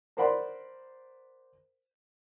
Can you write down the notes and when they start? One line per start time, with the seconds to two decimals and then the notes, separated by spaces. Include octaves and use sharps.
0.17 A#4 C5 D5 F#5 B5 C6